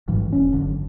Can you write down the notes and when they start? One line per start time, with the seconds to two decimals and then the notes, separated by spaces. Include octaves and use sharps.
0.08 A1 G#2 E3 G3
0.32 E1 C#4
0.53 G1 F#2 D3